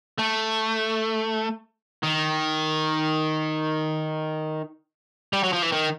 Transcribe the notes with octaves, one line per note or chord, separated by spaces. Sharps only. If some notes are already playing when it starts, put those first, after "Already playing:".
A3
D#3
G3
F#3
F3
E3
D#3